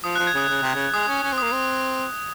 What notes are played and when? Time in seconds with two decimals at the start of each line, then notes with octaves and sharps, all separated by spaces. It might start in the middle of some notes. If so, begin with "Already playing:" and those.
0.04 F3 D#6
0.15 F3 F#6
0.27 G#6
0.34 C#3 D#6
0.49 C#3
0.62 C3
0.75 C#3
0.94 G#3 D#6
1.08 C#4
1.23 C#4
1.33 C4
1.38 A#3 D#6
1.52 C4